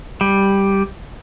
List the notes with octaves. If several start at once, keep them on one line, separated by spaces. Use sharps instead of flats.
G3